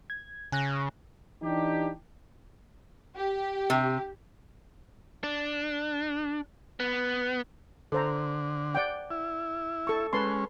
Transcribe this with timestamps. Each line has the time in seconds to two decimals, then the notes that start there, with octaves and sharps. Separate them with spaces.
0.10 G#6
0.52 C#3 G#5 F#6 A#6
1.43 E3 D4 D#4 G4
3.16 G4
3.70 C3
5.24 D4
6.80 B3
7.92 D3 A4 C5 A#5
8.75 D5 F#5 G5
9.10 E4
9.87 A4 C#6
10.13 G#3 C#4 B4 A5 C6